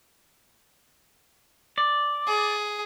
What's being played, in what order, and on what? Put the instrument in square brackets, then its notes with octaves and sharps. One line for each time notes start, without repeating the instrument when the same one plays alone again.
[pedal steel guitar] D5
[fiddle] G#4